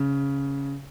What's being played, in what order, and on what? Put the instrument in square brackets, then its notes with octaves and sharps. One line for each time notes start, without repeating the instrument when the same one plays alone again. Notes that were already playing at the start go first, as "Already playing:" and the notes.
Already playing: [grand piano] C#3